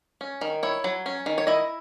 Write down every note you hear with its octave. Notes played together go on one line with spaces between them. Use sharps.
C#4
D#3
E4 C#5
F#3
C#4
D#3
C#5
E4 D#5